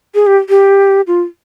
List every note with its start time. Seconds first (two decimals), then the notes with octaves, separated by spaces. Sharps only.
0.15 G#4
0.27 G4
0.49 G4
1.07 F4